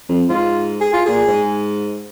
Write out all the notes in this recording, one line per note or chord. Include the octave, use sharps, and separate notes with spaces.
F2
G#2 F4
G#4
F4
A#2 G#4
G#2